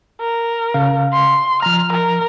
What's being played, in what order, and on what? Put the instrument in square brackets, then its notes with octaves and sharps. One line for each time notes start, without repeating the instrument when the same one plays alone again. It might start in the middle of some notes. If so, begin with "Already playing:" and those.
[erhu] A#4
[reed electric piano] C#3 F5
[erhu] C6
[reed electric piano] F3 A#5 [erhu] F6
[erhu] A#4